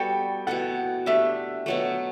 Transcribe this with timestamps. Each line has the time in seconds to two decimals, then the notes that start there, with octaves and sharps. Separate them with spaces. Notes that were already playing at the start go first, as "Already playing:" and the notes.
Already playing: G3 B3 F#4 A4 G5
0.47 B2 A3 E4 A4 F#5
1.06 A3 D4 G4 E5
1.66 B2 F#3 A3